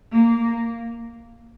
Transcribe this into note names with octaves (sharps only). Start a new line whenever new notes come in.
A#3